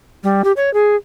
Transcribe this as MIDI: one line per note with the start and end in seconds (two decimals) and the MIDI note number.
0.24 0.42 55
0.44 0.52 67
0.57 0.72 73
0.74 0.96 68